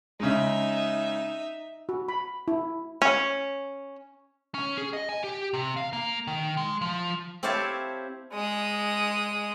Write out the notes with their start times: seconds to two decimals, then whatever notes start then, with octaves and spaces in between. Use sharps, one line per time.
0.20 C#3 G#3 D#4 E5
1.89 F#4
2.08 B5
2.48 E4
3.02 C#4
4.54 C#4
4.78 G#4
4.93 D#5
5.09 G#5
5.24 G4
5.54 C3
5.77 F5
5.93 A#3
6.27 D#3
6.57 G#3
6.81 F3
7.43 C4 E4 G4 C#5 F5 A5
8.33 G#3 D#6